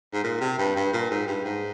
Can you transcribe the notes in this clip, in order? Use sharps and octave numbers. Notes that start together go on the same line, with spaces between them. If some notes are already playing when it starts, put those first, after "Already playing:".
G#2
A#2
C3
G2
G2
A#2
G#2
G2
G#2